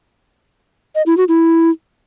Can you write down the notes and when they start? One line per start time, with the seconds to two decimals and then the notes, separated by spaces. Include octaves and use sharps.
0.95 D#5
1.06 E4
1.17 F#4
1.28 E4